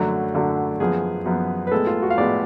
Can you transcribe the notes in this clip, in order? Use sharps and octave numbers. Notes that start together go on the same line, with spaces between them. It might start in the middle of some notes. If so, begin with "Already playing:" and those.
Already playing: F#2 D3 F#3 A3
F#2 D3 F#3 A3
F#2 F3 B3 G#4
F#2 F3 B3
B4
A2 G#3 B3 A4
F4
F#4
F5
A2 G#3 B3 D5